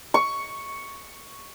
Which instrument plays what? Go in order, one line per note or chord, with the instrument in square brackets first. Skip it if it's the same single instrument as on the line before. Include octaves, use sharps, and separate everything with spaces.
[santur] C#6